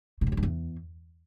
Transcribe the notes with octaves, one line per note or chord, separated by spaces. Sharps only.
B2
F#2
D3
G2
E2